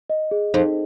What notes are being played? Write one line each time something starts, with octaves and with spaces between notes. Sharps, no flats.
D#5
G#4
F2 D#4